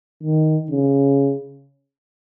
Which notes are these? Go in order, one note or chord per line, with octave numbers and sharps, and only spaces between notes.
D#3
C#3